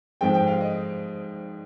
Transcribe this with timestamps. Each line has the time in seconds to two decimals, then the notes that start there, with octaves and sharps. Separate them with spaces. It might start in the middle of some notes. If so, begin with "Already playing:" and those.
0.21 G#2 F3 G#3 C4 G5
0.34 G5
0.47 F5
0.61 D#5